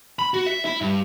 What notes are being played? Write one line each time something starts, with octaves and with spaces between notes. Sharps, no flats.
B5
F#4
E5
E4
G2